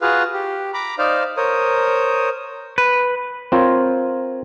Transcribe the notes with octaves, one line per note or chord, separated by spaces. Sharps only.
F4 F#4 G#4 B4 F5
G4
A#5 B5 D6
D#4 C5 D5 F5
A#4 C5 C#5 D#6
B4
C4 F4 A#4 C5 C#5